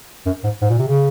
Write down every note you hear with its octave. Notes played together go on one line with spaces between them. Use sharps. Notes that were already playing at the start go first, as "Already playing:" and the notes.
F#2
G#2
G#2
A#2
C3
C#3